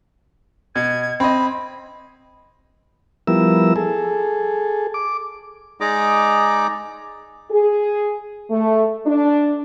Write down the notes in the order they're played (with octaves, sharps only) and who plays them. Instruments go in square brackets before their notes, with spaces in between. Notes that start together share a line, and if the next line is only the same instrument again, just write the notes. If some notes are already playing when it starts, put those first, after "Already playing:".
[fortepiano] B2 [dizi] G#6
[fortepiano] C4 D#5 [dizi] B5
[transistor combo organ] F3 G3 B3 E4 A#4 E6
G#4 A4
D6
[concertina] G#3 D#4 G#4 D5 A#5 D6
[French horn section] G#4
A3
D4